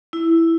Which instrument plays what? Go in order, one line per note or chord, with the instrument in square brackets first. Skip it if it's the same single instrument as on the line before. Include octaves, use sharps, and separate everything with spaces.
[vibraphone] E4